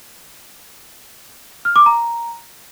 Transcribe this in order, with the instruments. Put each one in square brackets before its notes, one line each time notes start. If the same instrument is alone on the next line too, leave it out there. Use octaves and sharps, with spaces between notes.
[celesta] F6
D6
A#5